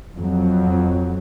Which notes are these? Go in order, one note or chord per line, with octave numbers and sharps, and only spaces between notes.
F2 F#3